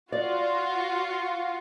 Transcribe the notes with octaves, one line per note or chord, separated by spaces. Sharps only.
F4 F#4 D5